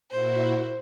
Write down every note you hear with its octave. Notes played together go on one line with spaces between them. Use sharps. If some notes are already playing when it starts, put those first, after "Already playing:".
A#2 E4 F#4 C5